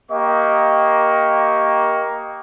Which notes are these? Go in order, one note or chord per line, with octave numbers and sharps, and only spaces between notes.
A#3 G4 D#5 C#6